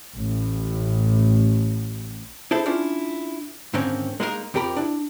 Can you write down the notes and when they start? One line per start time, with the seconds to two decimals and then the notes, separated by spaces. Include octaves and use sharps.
0.15 A1 A2
2.51 E4 G#4 A4 C5 E5
2.66 C#4 D4 E4 F4
3.74 G#2 D3 D#3 A#3 C4 C#4
4.20 G#3 A#3 D#4 E4 A#4
4.54 F2 F3 G4 A#4 B5
4.76 D4 E4